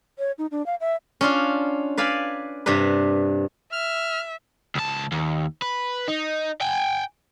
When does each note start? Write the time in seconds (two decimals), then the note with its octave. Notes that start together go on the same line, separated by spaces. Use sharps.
0.19 C#5
0.38 D#4
0.51 D4
0.66 F5
0.81 E5
1.21 C#4 D4 F4
1.97 B4 D5 F5 G#5 B5
2.66 G2 C3 D4 B4
3.72 E5 F6
4.75 C#2 A5
5.12 D#2
5.62 B4
6.08 D#4
6.61 G5 G#5